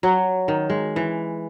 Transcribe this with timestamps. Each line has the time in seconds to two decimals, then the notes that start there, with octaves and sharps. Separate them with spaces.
0.03 F#3
0.48 D#3
0.70 G#3
0.96 E3